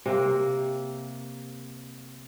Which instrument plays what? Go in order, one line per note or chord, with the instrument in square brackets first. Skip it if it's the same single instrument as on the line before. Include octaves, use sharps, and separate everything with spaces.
[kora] C3 A#3